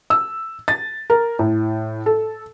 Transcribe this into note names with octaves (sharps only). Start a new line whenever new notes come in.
E6
A6
A#4
A2
A4